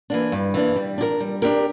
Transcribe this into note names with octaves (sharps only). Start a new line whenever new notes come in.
E3 A#3 D4
G2
E3 A#3 D4
G3
D4 G4 A#4
G3
D4 G4 A#4